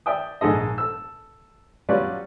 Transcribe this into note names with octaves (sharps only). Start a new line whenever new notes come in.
D5 E5 G5 D#6
A#1 G#2 G#3 A4 D#5
A4 E6
F#3 G3 C#4 F4 B4 D5